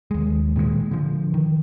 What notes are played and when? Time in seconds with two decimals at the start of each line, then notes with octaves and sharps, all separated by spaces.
0.11 D#2 G#3
0.56 A#2 D#3 E3 G#3
0.91 D3 F3
1.34 D#3